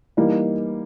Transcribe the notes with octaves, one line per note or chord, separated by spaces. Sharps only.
E3 G3 A#3 D#4